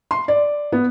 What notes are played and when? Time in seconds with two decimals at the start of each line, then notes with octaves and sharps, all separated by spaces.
0.11 C6
0.28 D5
0.72 B3